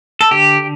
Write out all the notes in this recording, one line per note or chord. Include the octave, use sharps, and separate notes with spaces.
A4
D3 G4